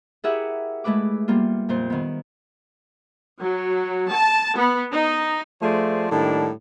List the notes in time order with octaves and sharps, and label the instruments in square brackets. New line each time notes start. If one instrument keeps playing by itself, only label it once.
[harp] E4 G4 G#4 A#4 E5 F#5
G#3 A3 E4 B4 D6
G3 A#3 B3 F4
F2 A#2 C5
D#3 B3
[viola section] F#3
A5
B3
D#4
[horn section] F3 A3 G#4 C5 D5
A2 D#3 G3 A#3 D4